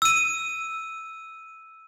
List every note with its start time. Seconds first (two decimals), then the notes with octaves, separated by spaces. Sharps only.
0.02 E6 D#7